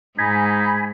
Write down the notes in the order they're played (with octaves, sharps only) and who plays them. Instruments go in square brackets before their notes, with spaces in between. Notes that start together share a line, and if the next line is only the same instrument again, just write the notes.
[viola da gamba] G#2 [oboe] D#4 [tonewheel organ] G#5 B5